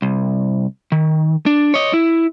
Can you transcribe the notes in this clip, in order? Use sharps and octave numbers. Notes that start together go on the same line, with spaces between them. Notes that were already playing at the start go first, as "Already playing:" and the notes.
C2
D#3
D4
C#5 D#5
E4